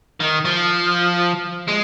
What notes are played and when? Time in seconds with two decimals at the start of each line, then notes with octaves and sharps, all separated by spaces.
0.20 D#3
0.45 F3
1.68 G#3